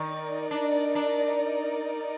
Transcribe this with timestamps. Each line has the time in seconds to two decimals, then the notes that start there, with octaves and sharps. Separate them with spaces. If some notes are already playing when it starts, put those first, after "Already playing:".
Already playing: D#3 D#4 A#4 D5
0.51 D4
0.95 D4